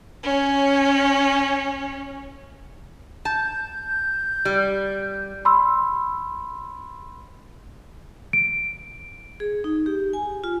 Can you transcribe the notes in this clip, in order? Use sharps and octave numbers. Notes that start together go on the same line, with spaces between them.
C#4 C#5
A5 G6
G3
B5 C6 E6
D7
G#4
D#4
G4
G#5
F4